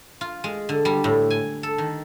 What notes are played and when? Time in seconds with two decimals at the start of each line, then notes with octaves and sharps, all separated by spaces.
0.21 F4
0.44 G#3
0.69 D3
0.85 G3
1.04 A2
1.30 G#5
1.63 A4
1.78 D#3